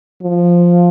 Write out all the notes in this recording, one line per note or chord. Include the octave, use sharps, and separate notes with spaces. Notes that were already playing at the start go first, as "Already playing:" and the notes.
F3